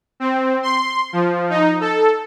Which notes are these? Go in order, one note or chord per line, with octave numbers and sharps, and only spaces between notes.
C4
C6
F3
D#4
A4